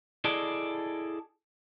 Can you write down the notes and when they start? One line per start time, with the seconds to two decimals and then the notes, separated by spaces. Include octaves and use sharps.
0.24 E4 G#4 A4 D5 D#5